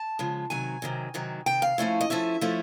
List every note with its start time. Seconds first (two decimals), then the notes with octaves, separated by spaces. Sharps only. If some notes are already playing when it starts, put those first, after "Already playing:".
Already playing: A5
0.19 C#3 F3 G#3
0.50 C3 D#3 F#3 G#5
0.82 C3 D#3 F#3
1.14 C3 D#3 F#3
1.46 C3 D#3 G5
1.62 F5
1.78 F3 A3 C#4 E4
2.01 D#5
2.10 F3 A3 C#4 E4 E5
2.41 F3 A3 C#4 E4